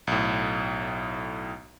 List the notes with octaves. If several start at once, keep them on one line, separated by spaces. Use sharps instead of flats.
B1 A2